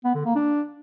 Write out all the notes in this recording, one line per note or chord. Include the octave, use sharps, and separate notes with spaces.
B3
D3
A#3
D4